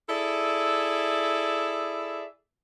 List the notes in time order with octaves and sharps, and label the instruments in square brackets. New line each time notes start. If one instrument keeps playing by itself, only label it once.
[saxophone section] E4 G#4 A4 D5 E5